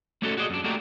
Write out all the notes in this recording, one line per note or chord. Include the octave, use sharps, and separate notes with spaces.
A3 A#3 C#4 D#4 F#4 A4
F#4 G#4 D5 D#5
F#2 D4
A3 A#3 D4 F#4 G4 A#4